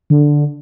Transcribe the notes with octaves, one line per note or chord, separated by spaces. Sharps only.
D3